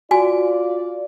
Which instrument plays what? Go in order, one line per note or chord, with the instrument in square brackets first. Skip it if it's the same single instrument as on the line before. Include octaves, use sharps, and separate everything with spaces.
[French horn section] F4 D5 [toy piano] F#4 G#5